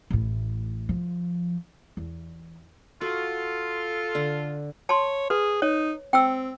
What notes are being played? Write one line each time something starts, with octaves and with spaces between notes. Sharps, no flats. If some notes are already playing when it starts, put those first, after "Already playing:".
A1 A2
F3
E2
F4 F#4 A4
D3
C#5 A5 C6
G#4 B4
D#4 C#5
C4 G5 E6